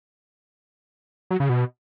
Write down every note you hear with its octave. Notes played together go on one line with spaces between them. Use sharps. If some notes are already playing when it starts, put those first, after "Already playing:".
F#3
C#3
B2